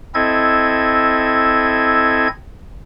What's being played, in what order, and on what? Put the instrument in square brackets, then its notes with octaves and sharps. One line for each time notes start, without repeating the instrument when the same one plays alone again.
[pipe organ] C4 E4 A4 D#5 G#6